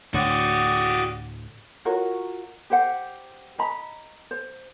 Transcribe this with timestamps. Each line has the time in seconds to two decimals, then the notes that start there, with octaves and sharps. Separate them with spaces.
0.14 D2 A2 D3 F#4 G4 D5 D#6
1.85 F4 F#4 A#4 C#5
2.70 G4 C5 F#5
3.58 D#5 A#5 B5
4.31 C5